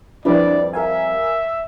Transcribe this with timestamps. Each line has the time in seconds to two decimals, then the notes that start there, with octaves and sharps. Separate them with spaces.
0.25 F2 G3 D4 E4 B4 D5
0.73 A#4 E5 F5 G#5